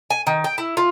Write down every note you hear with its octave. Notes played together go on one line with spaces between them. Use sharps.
G#5
D#3
G5
E4
F4